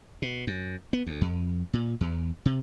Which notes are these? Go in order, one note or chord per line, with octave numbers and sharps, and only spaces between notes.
B2
F#2
B3
D2
F2
A#2
E2
C3